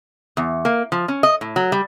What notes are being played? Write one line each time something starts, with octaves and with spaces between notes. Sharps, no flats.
E2
A#3
F3
C#4
D#5
A2
F#3
G3